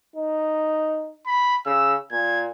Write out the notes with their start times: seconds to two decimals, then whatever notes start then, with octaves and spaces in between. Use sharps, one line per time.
0.16 D#4
1.27 B5
1.66 C#3 E6
2.12 A#2 G#6